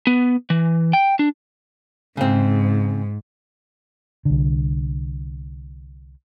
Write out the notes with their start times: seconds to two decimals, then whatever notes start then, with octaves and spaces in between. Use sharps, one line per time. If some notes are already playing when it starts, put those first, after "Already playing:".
0.07 B3
0.50 E3
0.93 G5
1.19 D4
2.17 G#2 C#3 C4
4.25 C2 D3